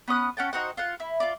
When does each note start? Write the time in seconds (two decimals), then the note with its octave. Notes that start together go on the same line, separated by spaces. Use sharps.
0.08 B3 C#4 D#6 F#6
0.37 C#4 F#5 G5 A5
0.53 D#4 F#4 C5 F#5
0.77 F4 F5 F#5
1.00 E4
1.20 F4 D5